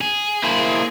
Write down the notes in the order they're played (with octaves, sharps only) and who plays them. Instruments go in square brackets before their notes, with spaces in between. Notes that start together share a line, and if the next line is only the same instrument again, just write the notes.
[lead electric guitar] G#4
[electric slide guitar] A#3 E4 C5